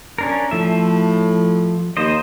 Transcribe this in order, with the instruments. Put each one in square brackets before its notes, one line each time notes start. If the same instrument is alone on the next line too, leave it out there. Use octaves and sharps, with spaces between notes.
[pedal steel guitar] C#4 D4 A#4
[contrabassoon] A2 [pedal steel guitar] F3 E5
[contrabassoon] D#2 [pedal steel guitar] C5 D#5